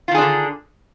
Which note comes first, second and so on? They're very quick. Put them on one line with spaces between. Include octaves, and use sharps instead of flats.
F4 D#3 G#4 D4 D3